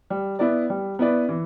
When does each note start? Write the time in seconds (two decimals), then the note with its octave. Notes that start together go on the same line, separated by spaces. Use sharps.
0.10 G3
0.39 B3 E4 B4 D5
0.70 G3
0.99 B3 E4 B4 D5
1.29 E3